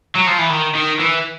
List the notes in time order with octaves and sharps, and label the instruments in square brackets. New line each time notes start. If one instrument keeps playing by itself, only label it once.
[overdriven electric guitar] F#3
F3
E3
D#3
D#3
E3